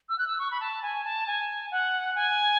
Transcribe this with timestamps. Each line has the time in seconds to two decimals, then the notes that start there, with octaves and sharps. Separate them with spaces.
0.09 E6
0.18 F#6
0.27 E6
0.39 C#6
0.51 B5
0.60 A5
0.82 G#5
1.05 A5
1.27 G#5
1.71 F#5
2.15 G#5